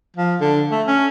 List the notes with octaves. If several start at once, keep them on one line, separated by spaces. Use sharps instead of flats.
F3
D3
A3
C#4